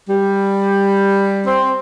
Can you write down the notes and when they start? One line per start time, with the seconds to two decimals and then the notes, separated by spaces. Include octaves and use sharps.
0.09 G3
1.46 C4